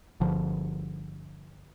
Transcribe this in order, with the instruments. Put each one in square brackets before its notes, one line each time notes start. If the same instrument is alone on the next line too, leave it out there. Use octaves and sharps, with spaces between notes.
[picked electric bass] G1 G2 D3 F3